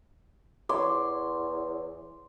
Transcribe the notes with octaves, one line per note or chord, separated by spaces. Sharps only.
E2 C#5 C6 D6